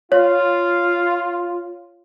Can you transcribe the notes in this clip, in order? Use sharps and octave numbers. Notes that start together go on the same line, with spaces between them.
F4 C#5